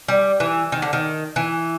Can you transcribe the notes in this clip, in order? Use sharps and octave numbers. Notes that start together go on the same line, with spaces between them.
G3
E3
D#3
D3
D#3
E3